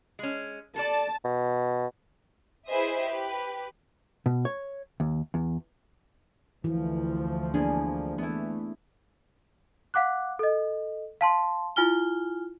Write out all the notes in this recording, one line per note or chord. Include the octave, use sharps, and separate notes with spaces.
G#3 C#4
A4 A#4 D5 A5
B2
E4 G#4 B4 C5 D#5 E5
G4 B4
B2
C#5
D#2
E2
D2 E3 F3
A#3 B3 D4 G#4
E3 A3 B3 E4
F5 F#5 D6 F#6
A4 D#5
F5 A5 C6
E4 F4 G#5 F6 G7